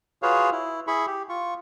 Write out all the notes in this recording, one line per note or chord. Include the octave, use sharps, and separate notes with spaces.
F4 F#4 G#4 B4 C#5 F5
E4
E4 G#4 B5 C#6
G4
F4 C#6